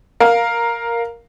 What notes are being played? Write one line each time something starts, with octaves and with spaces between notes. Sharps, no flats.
A#4 F5